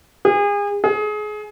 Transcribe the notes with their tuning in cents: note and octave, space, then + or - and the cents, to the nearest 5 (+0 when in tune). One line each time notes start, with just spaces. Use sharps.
G#4 -35
G#4 +25